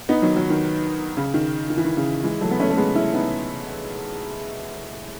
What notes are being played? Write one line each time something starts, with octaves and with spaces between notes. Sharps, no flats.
B3 D#4
D#3 F#3
D#3 F#3
D#3
C#3
D#3
D#3
E3
D#3
C#3
E3 G#3
F#3 A3
B3
A3 C#4
A3
G#3 B3
C#4 E4
B3 D#4